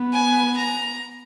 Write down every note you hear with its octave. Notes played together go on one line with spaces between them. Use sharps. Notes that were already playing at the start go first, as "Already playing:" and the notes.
Already playing: B3
G#5
A#5